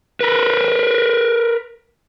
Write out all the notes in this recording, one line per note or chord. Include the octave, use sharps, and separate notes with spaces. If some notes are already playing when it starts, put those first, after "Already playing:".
A#4 B4